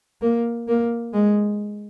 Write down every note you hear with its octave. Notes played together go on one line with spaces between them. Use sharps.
A#3
A#3
G#3